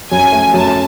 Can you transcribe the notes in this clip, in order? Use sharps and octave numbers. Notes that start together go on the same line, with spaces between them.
F#2 G#5
A3
F#2 A5